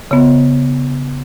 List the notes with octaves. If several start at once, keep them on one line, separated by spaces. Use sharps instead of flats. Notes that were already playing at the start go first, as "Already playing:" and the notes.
C#3 B3